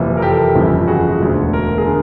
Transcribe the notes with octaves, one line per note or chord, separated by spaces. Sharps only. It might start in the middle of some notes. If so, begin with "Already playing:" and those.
Already playing: F#1 F2 C3 E3
A#4
G4 A4
G1 F2 C#3 E3
F#4 G#4
E1 D2 D3
A#4
G#4 A#4
D3